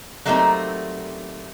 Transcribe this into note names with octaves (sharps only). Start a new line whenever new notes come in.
F#3 G3 A3 A#3 C4 D#4